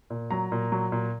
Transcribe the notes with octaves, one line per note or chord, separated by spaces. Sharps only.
A#2
F#3 A#5
A#2
F#3
A#2